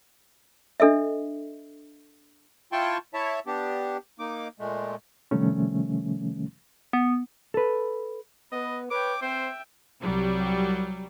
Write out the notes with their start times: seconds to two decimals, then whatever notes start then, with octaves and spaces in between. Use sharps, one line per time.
0.80 D4 A4 D#5 E5
2.72 E4 F4 G5 A5 C6 C#6
3.14 E4 C#5 E5 A5
3.47 B3 D4 G4
4.19 A#3 D#4 D6
4.60 A#2 G#3 A3
5.31 C3 D#3 F3 G3 A3 C#4
6.93 B3
7.54 A4 B4
8.52 B3 B4 D#5
8.91 B4 C#5 G5 D6
9.22 C4 C5 E5 G5
10.02 C2 F#3 G3